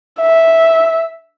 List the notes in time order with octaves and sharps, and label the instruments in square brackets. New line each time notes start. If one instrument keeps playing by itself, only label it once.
[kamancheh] E5